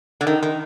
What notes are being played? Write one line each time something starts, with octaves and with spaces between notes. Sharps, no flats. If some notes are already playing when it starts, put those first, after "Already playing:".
D3
D#3
D#3